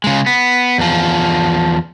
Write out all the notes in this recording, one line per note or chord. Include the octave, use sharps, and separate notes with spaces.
C#3 G#3
B3
E2 F3